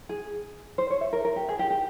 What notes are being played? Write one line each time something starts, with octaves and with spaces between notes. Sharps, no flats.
G#4
C5
C#5
E5
A#4
A#4
G4
G#4
G4
G4